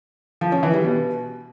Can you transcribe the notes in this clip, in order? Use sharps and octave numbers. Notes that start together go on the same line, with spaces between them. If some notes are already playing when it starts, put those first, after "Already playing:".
F3
C#4
E3
G3
B2